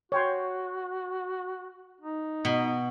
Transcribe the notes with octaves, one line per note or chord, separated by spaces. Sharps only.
F#4 C#5 G5 C6
D#4
B2